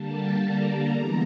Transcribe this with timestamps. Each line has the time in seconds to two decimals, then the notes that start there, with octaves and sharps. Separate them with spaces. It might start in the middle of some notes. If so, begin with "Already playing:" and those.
Already playing: D3 G3 A#3 A5
0.40 A#5
0.90 E3 G#3 B3 A#5